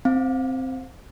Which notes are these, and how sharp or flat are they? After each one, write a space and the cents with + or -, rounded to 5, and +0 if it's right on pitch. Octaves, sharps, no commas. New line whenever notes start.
C4 +0 F5 +0